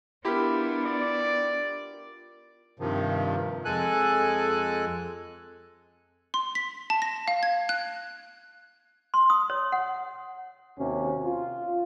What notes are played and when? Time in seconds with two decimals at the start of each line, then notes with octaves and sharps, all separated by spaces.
0.25 B3 D4 E4 F4 G4 A#4 B5
0.86 D5
2.80 G2 C3 D#3 F3
3.65 F2 G#3 A4 G#5 F#6
6.34 C6
6.55 B6
6.90 A5
7.02 A#6
7.28 F5
7.43 G#6
7.69 F#6
9.14 C6
9.30 D#6
9.50 C#5
9.72 F#5
10.79 D#2 C3 C#4 F#4
11.24 F4